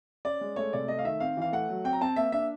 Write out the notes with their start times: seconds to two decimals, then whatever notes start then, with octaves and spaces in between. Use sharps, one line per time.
0.25 C#4 D5
0.41 G#3
0.56 A3 C#5
0.73 C3 D5
0.88 A3 D#5
0.99 F5
1.05 D#3 E5
1.20 C4 F5
1.37 E3 F5
1.52 A3 F#5
1.69 F#3
1.84 C4 G5
1.93 A#5
2.01 C4 A5
2.16 A#3 E5
2.32 D4 E5